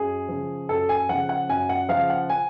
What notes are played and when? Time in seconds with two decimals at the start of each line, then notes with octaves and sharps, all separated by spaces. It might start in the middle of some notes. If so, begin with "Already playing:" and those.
Already playing: F#2 G#4
0.29 C#3 F3
0.69 F#2 A4
0.89 G#5
1.09 C#3 F3 F#5
1.29 F#5
1.49 F#2 G#5
1.69 F#5
1.89 C#3 F3 F5
2.10 F#5
2.30 G#5